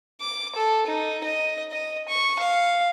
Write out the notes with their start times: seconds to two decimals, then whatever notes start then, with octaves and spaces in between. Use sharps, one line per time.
0.21 D6
0.55 A4
0.87 D#4
1.24 D#5
1.72 D#5
2.09 C#6
2.39 F5